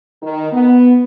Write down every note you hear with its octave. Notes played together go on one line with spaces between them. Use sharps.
D#3
B3